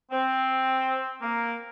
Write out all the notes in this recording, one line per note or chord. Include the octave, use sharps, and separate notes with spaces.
C4
A#3